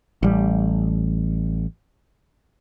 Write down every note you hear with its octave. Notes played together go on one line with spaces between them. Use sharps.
A1 G3